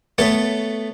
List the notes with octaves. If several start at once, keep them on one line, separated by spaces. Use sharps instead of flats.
A3 B3 A4 C#5